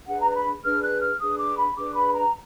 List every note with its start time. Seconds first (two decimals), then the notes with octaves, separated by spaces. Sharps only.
0.06 D4 G#4 B4 F#5
0.20 A#5
0.30 A#5
0.34 B5
0.63 D4 G#4 B4 F6
0.82 F#6
1.00 F6
1.20 D4 G#4 B4 D#6
1.38 D6
1.57 B5
1.76 D4 G#4 B4 D6
1.95 B5
2.13 A#5